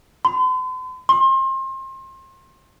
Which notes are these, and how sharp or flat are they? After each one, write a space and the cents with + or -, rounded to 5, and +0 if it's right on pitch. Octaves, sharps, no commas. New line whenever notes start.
C6 -45
C6 +30